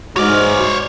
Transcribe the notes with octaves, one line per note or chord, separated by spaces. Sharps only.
G#2 F#4 C#5 D5 F6